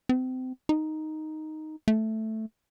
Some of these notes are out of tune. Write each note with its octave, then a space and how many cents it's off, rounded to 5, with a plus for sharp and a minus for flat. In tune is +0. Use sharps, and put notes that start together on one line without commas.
C4 -30
D#4 +0
A3 +0